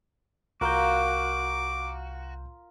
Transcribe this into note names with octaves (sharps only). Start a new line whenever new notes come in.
C2 F4 F#4 A#4 F5 A#5 D6 G6